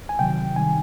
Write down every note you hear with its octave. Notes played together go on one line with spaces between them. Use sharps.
G#5
C3 D#3 F#3 G5
C3 D#3 G3 G#5